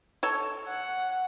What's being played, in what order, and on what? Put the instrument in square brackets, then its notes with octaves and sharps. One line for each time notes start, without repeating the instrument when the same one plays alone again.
[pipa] A4 C#5
[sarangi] F#5